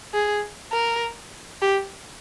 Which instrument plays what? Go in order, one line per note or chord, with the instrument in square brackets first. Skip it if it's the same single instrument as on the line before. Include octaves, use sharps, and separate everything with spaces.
[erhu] G#4
A#4
G4